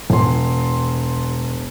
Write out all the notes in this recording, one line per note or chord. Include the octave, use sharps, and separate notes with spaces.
E1 C6